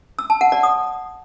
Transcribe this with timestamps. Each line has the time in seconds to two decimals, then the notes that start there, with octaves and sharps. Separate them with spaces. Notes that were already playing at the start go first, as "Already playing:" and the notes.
0.19 E6
0.30 A5
0.41 F#5
0.52 D5
0.63 D#6